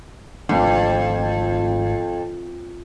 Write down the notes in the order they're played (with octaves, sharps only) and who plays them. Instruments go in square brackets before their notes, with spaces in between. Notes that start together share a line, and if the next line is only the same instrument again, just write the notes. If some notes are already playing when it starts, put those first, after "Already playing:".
[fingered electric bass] G#1 A3 D4 [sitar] F2